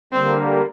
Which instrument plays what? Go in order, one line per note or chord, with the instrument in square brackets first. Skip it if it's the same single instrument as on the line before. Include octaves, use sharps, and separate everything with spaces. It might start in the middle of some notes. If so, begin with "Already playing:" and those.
[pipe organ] D3 G3 A#3 [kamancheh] C4